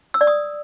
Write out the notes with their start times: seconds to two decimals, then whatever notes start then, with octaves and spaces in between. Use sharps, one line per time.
0.14 E6
0.21 D5
0.27 D#6